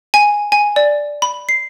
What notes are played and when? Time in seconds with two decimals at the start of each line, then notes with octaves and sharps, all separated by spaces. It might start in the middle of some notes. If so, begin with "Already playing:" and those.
0.14 G#5
0.52 G#5
0.76 D5
1.22 B5
1.49 C7